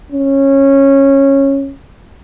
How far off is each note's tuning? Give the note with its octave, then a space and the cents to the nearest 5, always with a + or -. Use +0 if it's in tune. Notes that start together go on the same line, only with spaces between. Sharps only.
C#4 -15